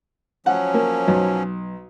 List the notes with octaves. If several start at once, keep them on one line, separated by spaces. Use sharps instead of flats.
F3 F#3 C#4 F#5
A#3
B1